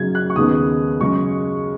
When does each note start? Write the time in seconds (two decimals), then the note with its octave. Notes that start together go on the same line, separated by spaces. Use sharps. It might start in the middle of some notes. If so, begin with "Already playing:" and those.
Already playing: F#2 C#3 F#3 G#6
0.15 F#6
0.30 C#6
0.36 D#2 C#3 G#3 B3 D#6
1.01 F#2 C#3 G#3 C#6